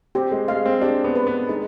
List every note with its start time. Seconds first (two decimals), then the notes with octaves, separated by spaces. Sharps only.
0.15 C4 G4
0.32 G#3
0.48 G#3 F5
0.66 C4
0.81 D4 G4
1.04 B3
1.15 B4
1.27 B3
1.49 G#3 D#4